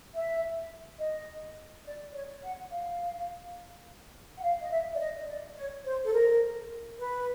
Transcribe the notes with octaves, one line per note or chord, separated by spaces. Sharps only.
E5
D#5
D5
C#5
F#5
F5
F#5
F5
D#5
E5
D5
D#5
D5
C#5
C5
A4
A#4
B4